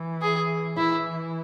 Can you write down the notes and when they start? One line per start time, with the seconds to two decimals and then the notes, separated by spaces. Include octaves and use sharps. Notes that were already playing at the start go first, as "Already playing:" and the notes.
Already playing: E3
0.22 G#4
0.77 E3 E4